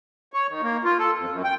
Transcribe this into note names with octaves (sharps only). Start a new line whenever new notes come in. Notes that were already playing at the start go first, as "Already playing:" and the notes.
C#5
D#3
A#3
F4
A4
F2
F#2
G5